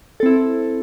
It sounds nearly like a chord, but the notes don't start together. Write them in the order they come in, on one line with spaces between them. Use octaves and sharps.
A4 C4 E4